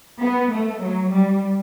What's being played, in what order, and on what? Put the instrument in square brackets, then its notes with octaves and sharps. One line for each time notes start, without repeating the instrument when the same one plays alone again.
[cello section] B3
A3
F#3
G3